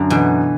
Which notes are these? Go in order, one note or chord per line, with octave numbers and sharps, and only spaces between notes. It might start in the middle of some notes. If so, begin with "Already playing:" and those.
Already playing: F#2 D3
B2 E3